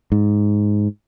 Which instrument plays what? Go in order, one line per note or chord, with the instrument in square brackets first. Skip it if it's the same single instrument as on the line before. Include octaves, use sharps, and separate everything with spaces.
[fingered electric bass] G#2